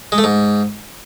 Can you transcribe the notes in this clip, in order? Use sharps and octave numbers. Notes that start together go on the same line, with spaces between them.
G#3
A3
G#2